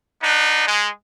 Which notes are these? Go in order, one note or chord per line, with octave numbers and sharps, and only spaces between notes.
B3 D4 D#4
G#3